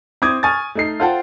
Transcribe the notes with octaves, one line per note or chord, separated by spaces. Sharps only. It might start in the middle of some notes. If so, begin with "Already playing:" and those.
C4 E4 C5 D6 D#6 G#6
G#5 C#6 D#6 F6 A6
A3 D#4 C7
F4 A4 C5 F#5 G5 A5